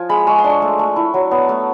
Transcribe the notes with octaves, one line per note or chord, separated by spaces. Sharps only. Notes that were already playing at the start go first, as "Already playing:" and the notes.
Already playing: F3 G#5
G#3 B5
G#3 C#6
C6
D4
C#6
A3
A3
E4
F#3
B3
A3